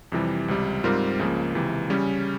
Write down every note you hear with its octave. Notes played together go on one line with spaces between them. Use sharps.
F2 C3 E3 G3
C#2 C3 G3
G#2 G3 C4 F4 A#4
C#2 C#3 F3 A#3
C#2 C3 E3
C#3 G3 C#4